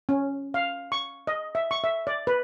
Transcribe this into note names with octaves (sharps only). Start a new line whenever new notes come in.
C#4
F5
C#6
D#5
E5
C#6
E5
D5
B4